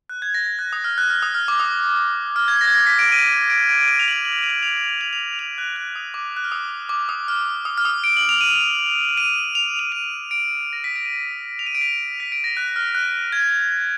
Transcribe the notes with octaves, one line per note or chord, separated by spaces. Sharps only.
F#6
G#6
A#6
A#6
F#6
D#6
F6
F#6
F6
D#6
F6
D6
D#6
F6
G#6
A#6
G#6
A#6
B6
D7
D#7
D7
D7
D7
D#7
F7
F#7
F7
F#7
D#7
F7
F7
F7
F7
D#7
F7
F#6
F#6
D#6
D6
F#6
F6
D#6
D6
D#6
F6
D#6
F6
D#6
D7
F#7
F7
D#7
D#7
F7
F7
D#7
D7
A#6
B6
D7
D#7
F7
D#7
D7
B6
B6
D7
A#6
F#6
F6
F#6
G#6